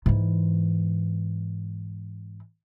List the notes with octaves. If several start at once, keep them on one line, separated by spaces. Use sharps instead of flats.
G#2 E3